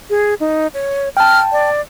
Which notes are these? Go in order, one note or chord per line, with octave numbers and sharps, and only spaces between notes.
G#4
D#4
C#5
G5 A5 F6
D5